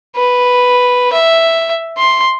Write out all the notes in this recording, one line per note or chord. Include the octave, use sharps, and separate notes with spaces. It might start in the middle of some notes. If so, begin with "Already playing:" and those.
B4
E5
C6